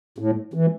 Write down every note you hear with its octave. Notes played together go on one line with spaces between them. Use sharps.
A2
E3